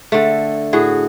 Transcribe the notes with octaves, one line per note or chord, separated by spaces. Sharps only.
D3 A3
A2 F#4 G#4